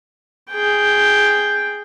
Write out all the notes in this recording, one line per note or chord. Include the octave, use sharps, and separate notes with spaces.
G#4 G5